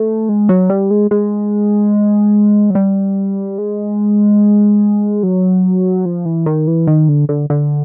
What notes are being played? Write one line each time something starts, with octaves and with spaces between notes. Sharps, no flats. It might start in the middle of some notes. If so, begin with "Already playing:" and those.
Already playing: A3
G#3
F#3
G3
G#3
G#3
F#3
G3
G#3
F#3
F3
E3
D#3
E3
D#3
D3
D3
D3